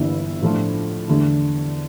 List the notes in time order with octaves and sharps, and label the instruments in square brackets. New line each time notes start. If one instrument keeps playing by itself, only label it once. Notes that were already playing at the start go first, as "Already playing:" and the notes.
Already playing: [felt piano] G1 G2 E3 A#3 E4
A2 F3 A3 D4 F4
E2 D3 A3 D4